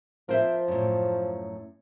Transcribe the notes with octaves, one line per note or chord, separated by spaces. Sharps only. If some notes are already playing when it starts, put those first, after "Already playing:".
F3 A#4 C5 E5
F#2 A2